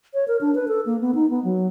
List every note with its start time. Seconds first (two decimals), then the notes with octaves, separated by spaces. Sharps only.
0.14 C#5
0.28 A#4
0.41 D4
0.55 B4
0.68 A4
0.86 A#3
1.01 B3
1.15 D#4
1.30 B3
1.44 F#3